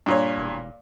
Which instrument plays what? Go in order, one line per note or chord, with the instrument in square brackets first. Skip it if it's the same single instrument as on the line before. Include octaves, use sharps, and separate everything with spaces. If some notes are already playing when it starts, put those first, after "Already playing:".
[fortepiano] G2 A#2 C#5
[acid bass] E1